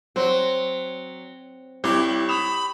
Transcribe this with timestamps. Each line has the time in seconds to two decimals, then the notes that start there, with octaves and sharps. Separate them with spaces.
0.16 F#3 C4
1.84 C2 E4 G4 C#5
2.28 B5 D#6 E7 F7